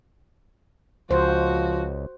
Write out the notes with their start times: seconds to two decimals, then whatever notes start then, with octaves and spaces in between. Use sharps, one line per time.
1.11 C#2 F3 F#4 C5